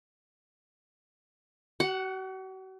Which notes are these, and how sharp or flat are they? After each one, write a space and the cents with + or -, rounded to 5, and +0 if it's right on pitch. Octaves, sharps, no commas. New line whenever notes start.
F#4 +40 F#5 +0